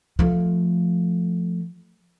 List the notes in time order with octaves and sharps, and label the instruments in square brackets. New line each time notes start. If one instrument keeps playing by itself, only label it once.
[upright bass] F3 A3